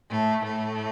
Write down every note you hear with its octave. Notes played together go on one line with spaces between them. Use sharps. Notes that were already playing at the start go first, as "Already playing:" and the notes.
A2 A3
A2 A3